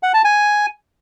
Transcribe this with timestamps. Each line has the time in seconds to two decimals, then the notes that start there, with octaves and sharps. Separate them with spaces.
0.03 F#5
0.14 A5
0.25 G#5